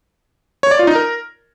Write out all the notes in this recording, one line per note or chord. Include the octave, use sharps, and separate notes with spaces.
C#5
D5
F4
D#4
A#4